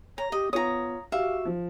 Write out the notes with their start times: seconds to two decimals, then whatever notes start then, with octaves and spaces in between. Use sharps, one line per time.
0.18 C#5 A#5
0.32 G4 D#5
0.53 B3 F4 C#5 A#5 D#6
1.12 F#4 G4 E5 F5
1.45 F3